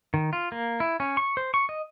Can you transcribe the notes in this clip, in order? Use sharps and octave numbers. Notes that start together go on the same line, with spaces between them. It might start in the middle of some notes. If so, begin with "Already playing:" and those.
D#3
F4
A#3
E4
C#4
C#6
C5
C#6
D#5